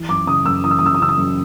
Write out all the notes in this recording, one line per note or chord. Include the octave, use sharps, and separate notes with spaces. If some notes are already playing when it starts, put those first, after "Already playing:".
Already playing: E3
F#2 D6
C#3 D#6
F#2 E6
E3 D#6
E6
D#6
F#2 E6
D#6
C#3 E6
D#6
F#2